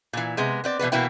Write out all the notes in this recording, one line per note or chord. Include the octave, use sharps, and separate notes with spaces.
A#2 E3
C3 G#3 B3
B3 C4 D5
B2 E3 B3 B4
B2 E3 A#3 B3 E4 G5